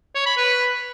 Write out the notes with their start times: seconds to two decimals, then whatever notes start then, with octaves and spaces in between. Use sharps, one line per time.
0.15 C#5
0.26 B5
0.37 B4